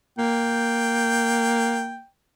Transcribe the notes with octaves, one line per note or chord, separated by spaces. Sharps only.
A#3 G5